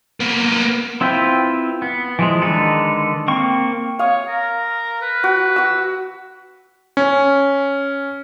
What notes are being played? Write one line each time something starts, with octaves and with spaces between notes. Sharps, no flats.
A#3 B3
C4 E4 F4 B4 G5
B3
E3 F3 G#3
D3 D#3 G#3 A4 B4
A#3 C4 C#6
C#5 F5 D#6
A#4
B4
F#4
F#4 E6
C#4